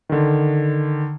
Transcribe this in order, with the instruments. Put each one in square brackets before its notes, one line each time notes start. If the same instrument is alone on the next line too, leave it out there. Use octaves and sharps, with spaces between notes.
[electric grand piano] D3 D#3